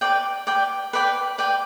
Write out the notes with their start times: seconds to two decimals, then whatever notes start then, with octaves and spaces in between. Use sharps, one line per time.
0.01 B4 D5 G5
0.47 B4 D5 G5
0.93 B4 D5 G5
1.38 B4 D5 G5